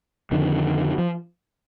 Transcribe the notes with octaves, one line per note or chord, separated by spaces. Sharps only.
F2 D3 D#3
F3